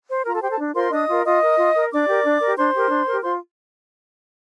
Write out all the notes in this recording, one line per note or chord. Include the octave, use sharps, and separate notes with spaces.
C5
F4 A#4 A#5
A4 A5
G4 C5 G5
A4 A5
D4
F4 A#4 C5 C6
D4 D#5 D#6
F4 A#4
F4 D#5 D#6
A#4
F4
A#4
D4 D5 D6
G4 A#4
D4
G4 A#4
D4 C5 C6
G4 A#4
D4
G4 A#4
F4 C5 C6